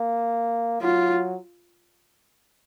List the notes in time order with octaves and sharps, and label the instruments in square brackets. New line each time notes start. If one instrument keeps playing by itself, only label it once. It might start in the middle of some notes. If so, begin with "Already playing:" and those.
Already playing: [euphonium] A#3
[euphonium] F#3 [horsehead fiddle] F4